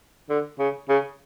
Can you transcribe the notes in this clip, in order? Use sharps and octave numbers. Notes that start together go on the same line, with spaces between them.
D3
C#3
C#3